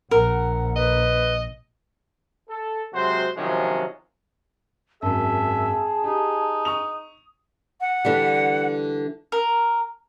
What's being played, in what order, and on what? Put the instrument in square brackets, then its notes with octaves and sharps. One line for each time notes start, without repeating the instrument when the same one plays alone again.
[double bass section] A#1 [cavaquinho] A#4 [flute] F#5
[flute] B4 [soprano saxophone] D#5
[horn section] A4
C3 F#3 G#3 F#4 C5
C3 D#3 F3 F#3 G#3 C#4
[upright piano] G#1 F#2 [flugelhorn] G#4 [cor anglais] E5 [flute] A5
[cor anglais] D#4 [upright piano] G4
[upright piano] C#6 D#6 F7
[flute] F#5
[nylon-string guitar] D3 E3 G3
[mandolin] A#4